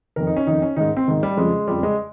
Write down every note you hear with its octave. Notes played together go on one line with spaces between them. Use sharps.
F2 D#3 A#4
D#4
C#4
F2 D#3 D#4
C#4
G#2 D#3 D#4
C4
G#2 D#3
G3
F2 C#3 F3 G#3
F2 C#3 F3 G3
G#3